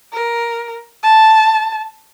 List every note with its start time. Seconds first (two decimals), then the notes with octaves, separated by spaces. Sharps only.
0.13 A#4
1.03 A5